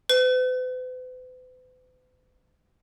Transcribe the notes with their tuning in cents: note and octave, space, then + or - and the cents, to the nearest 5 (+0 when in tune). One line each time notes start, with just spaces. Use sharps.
B4 +45